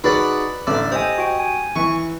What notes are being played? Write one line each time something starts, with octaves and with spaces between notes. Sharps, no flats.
D#4 F#4 G#4 B4 D5 F#5
A1 D3 D5 E6
G4 C5 D#5 G#5 D#6
F#4 G5
G#5
E3 C#6